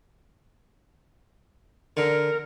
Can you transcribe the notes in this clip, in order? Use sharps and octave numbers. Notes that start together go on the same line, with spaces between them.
D3 A#4